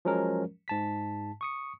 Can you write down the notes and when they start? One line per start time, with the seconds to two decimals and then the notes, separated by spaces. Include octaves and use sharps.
0.05 F3 F#3 G#3 C#4 A#4
0.68 G#2 A5 B6
1.41 C#6 D#6 C#7